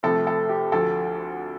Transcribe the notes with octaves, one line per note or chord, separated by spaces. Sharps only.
C2 C3 F3 A3 C4 A4
A4
G4
D2 D3 F3 A4